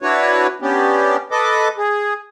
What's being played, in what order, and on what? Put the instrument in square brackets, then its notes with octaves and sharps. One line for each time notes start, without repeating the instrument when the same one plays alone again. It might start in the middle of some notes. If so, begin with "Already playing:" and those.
[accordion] D4 E4 F#4 B4 C#5
B3 C#4 D4 G4
A4 B4 D#5 D6
G#4